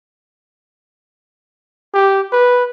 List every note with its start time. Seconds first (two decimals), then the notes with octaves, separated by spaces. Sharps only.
1.94 G4
2.32 B4